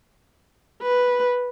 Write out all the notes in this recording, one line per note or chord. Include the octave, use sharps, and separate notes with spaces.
B4